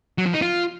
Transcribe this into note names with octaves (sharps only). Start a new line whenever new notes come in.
F#3
F3
D#4
F4